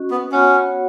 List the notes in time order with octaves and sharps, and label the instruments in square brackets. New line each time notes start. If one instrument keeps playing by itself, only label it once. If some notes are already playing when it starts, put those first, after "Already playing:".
Already playing: [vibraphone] C#4 F#4 D#5
[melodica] B3
[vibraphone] B3 F#4 C#5 F#5 [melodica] C#4